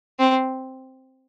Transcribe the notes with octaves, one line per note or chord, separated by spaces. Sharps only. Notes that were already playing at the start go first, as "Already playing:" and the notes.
C4